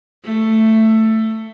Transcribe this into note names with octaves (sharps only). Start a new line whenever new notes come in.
A3